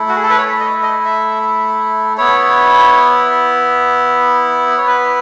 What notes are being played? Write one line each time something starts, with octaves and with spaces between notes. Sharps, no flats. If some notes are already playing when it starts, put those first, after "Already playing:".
Already playing: A3 E4
F#4
G#4
A4
B4
C#5
D#5
D#5
E5
B3 E4 C#5
C#5
B4